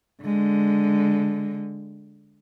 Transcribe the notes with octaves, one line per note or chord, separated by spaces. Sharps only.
D3 G#3